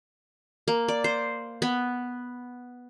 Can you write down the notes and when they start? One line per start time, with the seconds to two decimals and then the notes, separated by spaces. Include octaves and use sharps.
0.68 A#3
0.88 D5
1.04 C5
1.62 B3